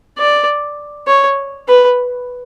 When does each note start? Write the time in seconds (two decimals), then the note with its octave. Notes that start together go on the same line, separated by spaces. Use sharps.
0.18 D5
1.07 C#5
1.68 B4